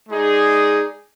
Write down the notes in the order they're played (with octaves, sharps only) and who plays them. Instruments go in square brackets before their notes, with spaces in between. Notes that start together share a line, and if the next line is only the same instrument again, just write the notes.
[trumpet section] G#3 D#4 G#4 D5